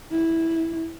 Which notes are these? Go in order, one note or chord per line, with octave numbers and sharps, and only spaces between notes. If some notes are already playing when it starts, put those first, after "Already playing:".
E4